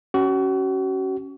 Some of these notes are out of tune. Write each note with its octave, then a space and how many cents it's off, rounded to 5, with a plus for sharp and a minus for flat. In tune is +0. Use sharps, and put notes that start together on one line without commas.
C#4 +0 F#4 +35